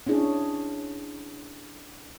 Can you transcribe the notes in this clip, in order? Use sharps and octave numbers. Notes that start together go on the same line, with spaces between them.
C#4 D4 E4 G#4 C#5